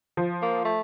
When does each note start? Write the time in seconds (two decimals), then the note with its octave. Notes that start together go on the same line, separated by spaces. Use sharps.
0.17 F3
0.42 A#3
0.65 A3